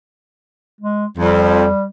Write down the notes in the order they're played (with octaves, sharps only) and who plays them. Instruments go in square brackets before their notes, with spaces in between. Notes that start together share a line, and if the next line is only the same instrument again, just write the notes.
[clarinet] G#3
[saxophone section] F2 [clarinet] G3